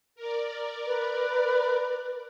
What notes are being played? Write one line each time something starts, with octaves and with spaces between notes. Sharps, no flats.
A#4 D5
B4